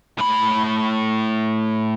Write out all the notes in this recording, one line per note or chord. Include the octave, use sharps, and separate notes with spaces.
A2 B5